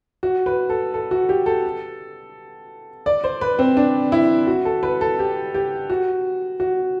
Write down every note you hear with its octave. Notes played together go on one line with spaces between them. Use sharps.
F#4
B4
A4
A4
F#4
G4
A4
D5
C5
B4
C4
D4
E4
F#4
A4
B4
A4
G4
G4
F#4
F#4